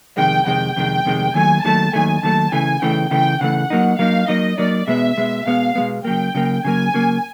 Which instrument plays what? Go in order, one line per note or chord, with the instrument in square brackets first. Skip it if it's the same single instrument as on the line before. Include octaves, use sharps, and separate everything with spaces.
[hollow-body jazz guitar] F2 C3 D#3 G#3 [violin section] G5
[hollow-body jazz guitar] F2 C3 D#3 G#3 [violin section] G5
[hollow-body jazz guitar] F2 C3 D#3 G#3
F2 C3 D#3 G#3
[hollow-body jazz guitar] D#2 D#3 F#3 A3 [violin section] G#5
[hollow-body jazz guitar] D#2 D#3 F#3 A3 [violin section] A5
[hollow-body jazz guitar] D#2 D#3 F#3 A3 [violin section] G#5
[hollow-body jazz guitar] D#2 D#3 F#3 A3 [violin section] A5
[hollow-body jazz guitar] C#3 E3 A3 [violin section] G#5
[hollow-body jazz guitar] C#3 E3 A3 [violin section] G5
[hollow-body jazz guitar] C#3 E3 A3 [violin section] G5
[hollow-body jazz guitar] C#3 E3 A3 [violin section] F#5
[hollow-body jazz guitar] F#3 A#3 D#4
[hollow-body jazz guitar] F#3 A#3 D#4 [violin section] F5
[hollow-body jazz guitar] F#3 A#3 D#4 [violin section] D#5
[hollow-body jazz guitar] F#3 A#3 D#4 [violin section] D5
[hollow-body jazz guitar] B2 G#3 B3 [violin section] E5
[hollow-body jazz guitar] B2 G#3 B3
[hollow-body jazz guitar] B2 G#3 B3 [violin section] F5
[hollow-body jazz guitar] B2 G#3 B3
[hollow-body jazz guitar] C#3 F#3 A#3 [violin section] G5
[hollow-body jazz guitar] C#3 F#3 A#3
[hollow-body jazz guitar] C#3 F#3 A#3 [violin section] G#5
[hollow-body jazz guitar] C#3 F#3 A#3